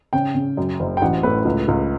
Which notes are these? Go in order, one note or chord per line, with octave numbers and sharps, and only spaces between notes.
C#3 G5
C#3
F#2
F#1
G5
A1 F#5
A2 B4
C#2
C#2